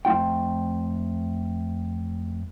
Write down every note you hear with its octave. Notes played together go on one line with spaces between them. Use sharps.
F2 A3 F4 G5